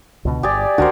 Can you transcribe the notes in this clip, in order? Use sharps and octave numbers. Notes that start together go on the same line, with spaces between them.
C#2 B2 D3
G1 G4 G#4 D5
C#2 D3 D4 F#4 A#4 C5